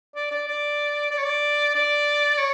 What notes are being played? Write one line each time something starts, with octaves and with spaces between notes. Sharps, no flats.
D5
D5
D5
D5
C#5
D5
D5
C#5